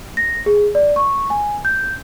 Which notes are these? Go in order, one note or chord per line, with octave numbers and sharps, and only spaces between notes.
A#6
G#4
D5
C#6
G#5
G6